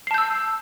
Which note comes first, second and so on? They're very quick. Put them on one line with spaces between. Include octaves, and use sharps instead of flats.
C7 A5 G6 E6